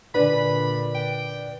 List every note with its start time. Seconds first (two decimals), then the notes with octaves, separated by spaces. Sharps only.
0.15 A#2 D3 D4 B4 G#5 B5
0.95 G5